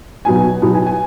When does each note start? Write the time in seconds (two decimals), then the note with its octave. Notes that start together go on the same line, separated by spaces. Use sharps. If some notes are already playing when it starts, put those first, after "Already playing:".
0.25 B2 F#3 B3 D#4 G#5
0.62 B2 F#3 B3 D#4
0.75 G#5
0.86 G#5